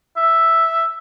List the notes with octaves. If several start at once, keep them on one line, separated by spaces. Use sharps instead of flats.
E5